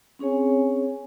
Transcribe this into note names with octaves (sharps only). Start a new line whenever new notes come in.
C4 C#4 G#4 C#5 G#5